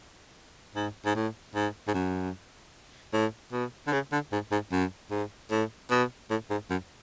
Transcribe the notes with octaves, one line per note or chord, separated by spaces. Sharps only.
G#2
G#2
A2
G#2
G#2
F#2
A2
B2
D3
C#3
D3
G#2
G#2
F#2
G#2
A2
B2
A2
G#2
F#2